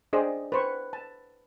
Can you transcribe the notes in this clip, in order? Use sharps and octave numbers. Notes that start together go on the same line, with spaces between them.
D4 G#4 C5 D5 D#5
B4 C5 C#6
A5